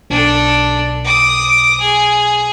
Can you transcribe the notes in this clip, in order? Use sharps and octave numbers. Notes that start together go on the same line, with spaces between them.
B1 D4 A4
D6 D#6
G#4